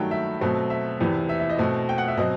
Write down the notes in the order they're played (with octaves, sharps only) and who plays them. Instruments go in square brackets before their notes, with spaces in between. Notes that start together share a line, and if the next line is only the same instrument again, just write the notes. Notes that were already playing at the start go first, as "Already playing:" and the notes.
Already playing: [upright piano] G2 D#3 F#3 A3 G5
E5
B2 F#3 A3 C4
E5
E2 C3 E3
E5
E5
D#5
B2 A3 C4
G5
F#5
E5
B2 F#3 C4 D#5